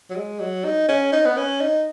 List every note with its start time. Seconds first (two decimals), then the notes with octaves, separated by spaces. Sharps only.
0.10 F#3
0.16 G#3
0.40 F#3
0.65 D#4
0.89 C#4
1.12 D#4
1.26 B3
1.37 C#4
1.61 D#4